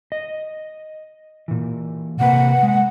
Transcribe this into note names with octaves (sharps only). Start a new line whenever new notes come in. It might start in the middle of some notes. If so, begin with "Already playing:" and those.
D#5
A#2 E3
C3 A#3 B4 F#5
G#3